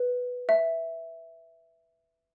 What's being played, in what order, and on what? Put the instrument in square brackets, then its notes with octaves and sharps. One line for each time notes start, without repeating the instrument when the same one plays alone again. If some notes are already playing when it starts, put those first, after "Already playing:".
Already playing: [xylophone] B4
E5